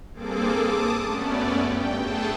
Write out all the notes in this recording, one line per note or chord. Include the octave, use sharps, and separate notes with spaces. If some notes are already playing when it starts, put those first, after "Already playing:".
G2 A#3 C4 G#4 A4 D6
A5 D6 D#6
F#2 A3 B3 C#4 D5
G2 G5
A3 B3 G#4 A4 G5 A5